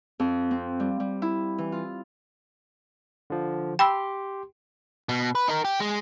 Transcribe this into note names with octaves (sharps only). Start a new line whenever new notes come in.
F2
C4
G3
G3
E4
E3
F4
D3 F3
G4 G5 B5 C6 E6
B2
B4
D#4 A#4
G4
G#3